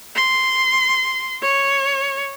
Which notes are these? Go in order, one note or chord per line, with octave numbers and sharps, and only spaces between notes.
C6
C#5